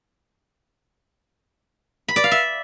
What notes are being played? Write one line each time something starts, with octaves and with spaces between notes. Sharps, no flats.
B5
D5
F5
E5